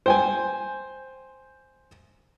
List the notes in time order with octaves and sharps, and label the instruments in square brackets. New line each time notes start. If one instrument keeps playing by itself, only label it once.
[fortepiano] C5 G5 G#5